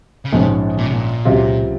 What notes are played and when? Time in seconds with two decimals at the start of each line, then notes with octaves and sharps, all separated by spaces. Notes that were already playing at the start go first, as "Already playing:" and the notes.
0.25 C#3
0.32 A#1 G#2 C3 F3 G#3 C#4
0.78 A#2
0.86 C3
0.93 A#2
1.25 C#2 C3 F#3 C4 F4